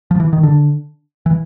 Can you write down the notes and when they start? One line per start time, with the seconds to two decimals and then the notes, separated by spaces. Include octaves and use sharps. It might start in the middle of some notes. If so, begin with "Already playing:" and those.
0.11 F3
0.20 E3
0.33 D#3
0.43 D3
1.26 E3